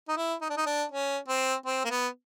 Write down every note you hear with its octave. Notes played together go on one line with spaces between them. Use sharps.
D#4
E4
D#4
D4
D#4
D4
C#4
C4
C4
A#3
B3